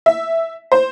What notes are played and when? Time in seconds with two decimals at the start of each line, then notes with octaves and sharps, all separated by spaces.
0.06 E5
0.72 C5